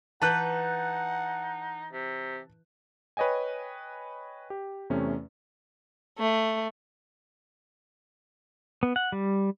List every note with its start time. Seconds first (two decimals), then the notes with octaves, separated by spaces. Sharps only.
0.22 E3 D#4 B4 F#5 A5 F#6 G6
1.92 C3
3.17 B4 C#5 D#5 G5 G#5
4.50 G4
4.90 E2 C3 A3 C#4
6.18 A3
8.83 B3
8.96 F#5
9.12 G3